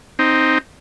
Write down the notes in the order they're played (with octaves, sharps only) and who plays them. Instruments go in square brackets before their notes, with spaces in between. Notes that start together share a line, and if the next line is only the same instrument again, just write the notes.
[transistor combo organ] C4 D#4